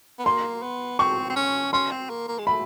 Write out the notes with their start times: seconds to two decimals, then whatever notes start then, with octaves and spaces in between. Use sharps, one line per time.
0.19 B3
0.25 A#3 C6
0.63 B3
0.99 C4 C#6
1.30 C4
1.36 C#4
1.73 C#4 C6
1.91 C4
2.10 A#3
2.28 A#3
2.38 G#3
2.46 A3 B5